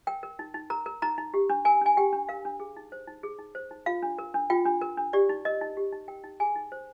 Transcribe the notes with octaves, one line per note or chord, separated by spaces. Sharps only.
A#4 G5
A#4
D#4
D#4
A#4 A#5
A#4
D#4 A#5
D#4
G4
D4
A#4 G#5
D4 G#5
G4 G5
D4
A#4 F5
D4
G#4
D#4
C5
D#4
G#4
D#4
C5
D#4
F4 F5
D4
A#4
D4
F4 G5
D4
A#4
D4
G4 D5
D#4
A#4 D#5
D#4
G4
D#4
A#4 G5
D#4
G#4 G#5
D#4
C5